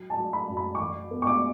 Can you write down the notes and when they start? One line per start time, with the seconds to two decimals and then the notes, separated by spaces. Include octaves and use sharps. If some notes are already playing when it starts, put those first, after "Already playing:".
Already playing: F#3
0.10 A5
0.18 F#3
0.33 B5
0.49 F#2
0.57 B5
0.75 C#6
0.80 E3 D6
1.11 B3
1.22 C#6
1.27 D6